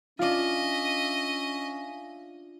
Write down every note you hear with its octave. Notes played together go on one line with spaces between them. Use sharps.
C#4 D4 F4 D#5 E5